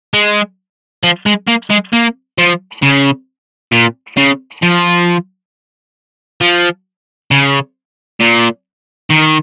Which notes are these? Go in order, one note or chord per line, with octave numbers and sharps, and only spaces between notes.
G#3
F3
G#3
A#3
G#3
A#3
F3
C#3
A#2
C#3
F3
F3
C#3
A#2
D#3